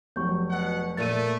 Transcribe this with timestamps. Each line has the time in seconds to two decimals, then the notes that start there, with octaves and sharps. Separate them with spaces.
0.16 F1 F#3 C#6 G6
0.48 B2 F#5
0.97 A#2 A3 A#3 A#4 A6 D#7